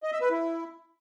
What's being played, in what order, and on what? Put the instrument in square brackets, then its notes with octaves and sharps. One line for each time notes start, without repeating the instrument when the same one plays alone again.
[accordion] D#5
E5
B4
E4